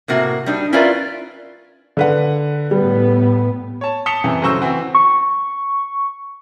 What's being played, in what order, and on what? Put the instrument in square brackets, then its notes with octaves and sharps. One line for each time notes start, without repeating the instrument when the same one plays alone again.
[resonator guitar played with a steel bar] A2 C3 A#3 F#4
G3 D4 D#4
C#4 E4 F4 A#4 B4 D5
[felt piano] D3 B4 F#5
[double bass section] A2 B3 [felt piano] G3
[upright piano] C#5 A5
A5 D#6 B6 C#7 F7 G7
F#2 C3 E3
C#3 F#3 A3 C5 C#6 E6
E3 C4 F#4
[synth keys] C#6